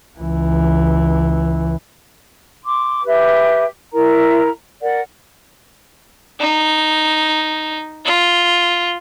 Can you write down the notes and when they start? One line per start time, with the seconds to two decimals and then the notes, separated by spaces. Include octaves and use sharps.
0.17 C#2 E3
2.64 C6 D6
3.05 G4 B4 E5
3.93 E4 A#4 A#5
4.81 A#4 D5 F#5
6.40 D#4
8.05 F4